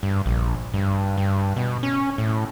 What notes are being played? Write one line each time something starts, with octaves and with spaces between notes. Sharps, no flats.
G2
A#1
G2
G2
B2
C#4
A2